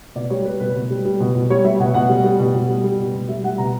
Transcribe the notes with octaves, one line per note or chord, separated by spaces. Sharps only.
B2 D5
G3 C#5
G3 B4
B2 B4
B2
G3
G3
B2
B2
G3 C#5
G3 E5
B2 F#5
B2 F#5
G3
G3
B2
B2
G3
G3
B2
B2
G3 E5
G3 F#5
B2 A#5